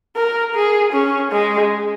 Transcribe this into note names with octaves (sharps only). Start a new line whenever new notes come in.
A#4
G#4
C#4
G#3